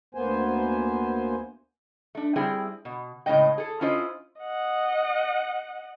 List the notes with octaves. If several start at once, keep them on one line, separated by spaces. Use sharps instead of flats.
D2 A#3 B3 C5 G#5
A3 D4
G3 C4 E4 G#4 G5
B2
A2 C#3 G#3 D#5 G5
G#4 A4
C#4 E4 F4 C5 D#5
D#5 F#5